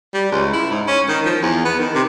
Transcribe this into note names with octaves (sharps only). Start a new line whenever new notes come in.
G3
C#2
E4
G#2
C#4
D#3
F3
E2
B3
D#3
C3